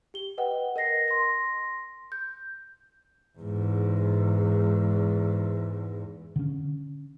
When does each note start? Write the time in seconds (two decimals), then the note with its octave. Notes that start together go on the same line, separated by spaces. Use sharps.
0.14 G4 G7
0.38 B4 D#5 F#5 G5
0.76 A#4 D#5 A#6 C7
1.08 C6 A#6
2.12 G6
3.38 E2 G#2
6.36 D3 C#4